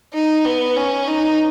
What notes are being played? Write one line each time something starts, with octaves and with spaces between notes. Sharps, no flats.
D#4
B3
C#4
D#4